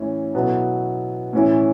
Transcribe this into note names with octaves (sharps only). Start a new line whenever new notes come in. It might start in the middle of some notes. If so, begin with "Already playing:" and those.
Already playing: A2 E3 C#4 E4
B2 F#3 B3 E4 A4
A2 E3 C#4 E4